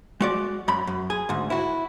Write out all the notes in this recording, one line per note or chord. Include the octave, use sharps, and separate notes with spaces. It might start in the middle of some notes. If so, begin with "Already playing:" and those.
G#3 F#4 D5
F#2 B5
F#2
G#4
D2 G#2
E4 F#4